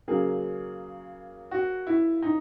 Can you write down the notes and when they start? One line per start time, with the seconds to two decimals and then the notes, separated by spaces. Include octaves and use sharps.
0.08 C#3 F#3 A#3 G#4
1.51 F#4
1.87 E4
2.22 D#4